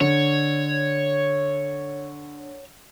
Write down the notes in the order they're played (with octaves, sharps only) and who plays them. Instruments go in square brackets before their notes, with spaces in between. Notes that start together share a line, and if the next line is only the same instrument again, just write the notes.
[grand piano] D3 [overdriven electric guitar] C#5